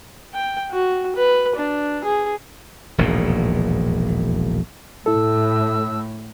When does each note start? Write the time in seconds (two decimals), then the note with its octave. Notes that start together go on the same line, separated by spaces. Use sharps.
0.34 G5
0.71 F#4
1.16 B4
1.56 D4
2.04 G#4
2.98 E1 A#1 D#2 A2
5.06 A2 E4 A4 E6